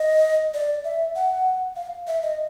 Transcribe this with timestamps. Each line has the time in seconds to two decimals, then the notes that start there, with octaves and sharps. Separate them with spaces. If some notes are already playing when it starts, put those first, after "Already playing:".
Already playing: D#5
0.54 D5
0.84 E5
1.15 F#5
1.76 F5
2.07 E5
2.23 D#5